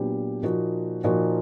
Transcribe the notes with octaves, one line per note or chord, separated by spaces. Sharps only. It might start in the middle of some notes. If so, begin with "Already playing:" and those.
Already playing: A#2 F#3 B3 D4 G4
A#2 F3 A#3 D#4 F#4
A#2 F3 A#3 D#4 F#4